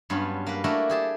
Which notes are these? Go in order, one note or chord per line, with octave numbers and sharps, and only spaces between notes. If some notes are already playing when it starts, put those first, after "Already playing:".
G2 F#3 B3 C#4 F4
A#3 B4
A3 A#3 D4 E4 F#4 A#4
G4 G#4 A5